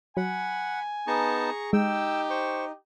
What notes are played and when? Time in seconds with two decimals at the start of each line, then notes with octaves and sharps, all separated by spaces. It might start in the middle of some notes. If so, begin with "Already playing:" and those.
0.17 F#3 F#5 G#5 B5
1.07 B3 D#4 G#4 A5 A#5 C#6
1.73 G#3 D#4 G4 G5 E6
2.30 C5 C#6